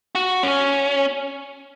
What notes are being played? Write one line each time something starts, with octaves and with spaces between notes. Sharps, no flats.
F#4
C#4